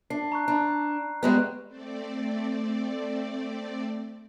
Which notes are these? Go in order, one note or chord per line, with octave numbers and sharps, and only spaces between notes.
D4 C7
A#5 C#6 F#6
D4 A#5 B5
G3 G#3 B3 F#6
A3 C4 D5